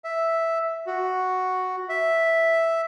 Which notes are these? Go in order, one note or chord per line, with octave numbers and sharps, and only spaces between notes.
E5
F#4
E5